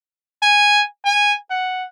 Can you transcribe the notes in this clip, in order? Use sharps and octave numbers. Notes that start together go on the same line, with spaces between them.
G#5
G#5
F#5